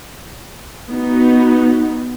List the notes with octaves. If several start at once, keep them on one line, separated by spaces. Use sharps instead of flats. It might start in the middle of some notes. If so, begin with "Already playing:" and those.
B3 D#4 F#4